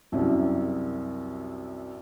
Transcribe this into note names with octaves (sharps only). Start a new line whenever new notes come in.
C2 F#2 C3